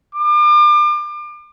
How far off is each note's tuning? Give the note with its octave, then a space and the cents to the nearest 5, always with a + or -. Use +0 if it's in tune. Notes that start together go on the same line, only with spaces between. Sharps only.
D6 +35